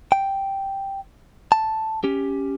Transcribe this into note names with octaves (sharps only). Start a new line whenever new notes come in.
G5
A5
C#4 G4